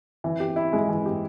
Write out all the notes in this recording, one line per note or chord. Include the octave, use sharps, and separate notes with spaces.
E3
G4
E4
G#3
E3
G4